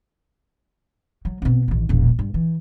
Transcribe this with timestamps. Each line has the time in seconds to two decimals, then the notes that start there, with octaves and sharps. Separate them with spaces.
1.25 F#3
1.42 B2 C4
1.68 A1 D#3
1.89 E1 A#1
2.19 G2
2.34 E3